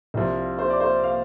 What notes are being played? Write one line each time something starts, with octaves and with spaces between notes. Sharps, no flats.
C2 C3 F3
C5
D5
C5
F5